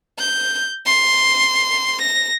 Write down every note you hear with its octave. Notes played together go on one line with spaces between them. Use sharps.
G6
C6
A#6